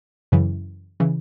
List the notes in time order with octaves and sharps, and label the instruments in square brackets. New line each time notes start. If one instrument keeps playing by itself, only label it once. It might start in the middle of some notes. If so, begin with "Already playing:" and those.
[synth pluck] F#2 C#3 E3
C#3 E3